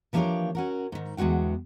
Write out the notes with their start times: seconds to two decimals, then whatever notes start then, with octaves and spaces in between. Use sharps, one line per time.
0.13 E3 F3 A#3 D4 G4 C#5
0.55 C#4 F#4 A#4
0.92 G#2 D#3
1.17 E2 D3 G#3 F#4 G5